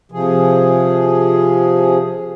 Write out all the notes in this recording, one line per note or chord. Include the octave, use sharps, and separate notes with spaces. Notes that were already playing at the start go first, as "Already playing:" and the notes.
C3 F3 G#4